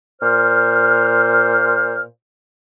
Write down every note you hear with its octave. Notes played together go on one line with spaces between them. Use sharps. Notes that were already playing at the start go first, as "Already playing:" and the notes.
A#2 C5 F6